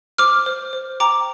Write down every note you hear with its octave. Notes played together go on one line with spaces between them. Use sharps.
C5 D6 F6
C5
C5
G5 A#5 D6